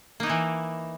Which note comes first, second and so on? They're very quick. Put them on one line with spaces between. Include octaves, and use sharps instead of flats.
A#3 D#4 E4 E3